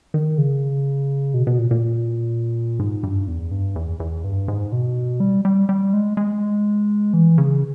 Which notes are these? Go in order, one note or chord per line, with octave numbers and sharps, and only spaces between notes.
D#3
C#3
B2
B2
A#2
A#2
G#2
G2
E2
G2
E2
E2
G2
G#2
B2
G3
G3
G3
G#3
G#3
E3
C#3